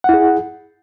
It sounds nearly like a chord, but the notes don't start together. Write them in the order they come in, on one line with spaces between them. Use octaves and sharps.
F#5 E4 G#4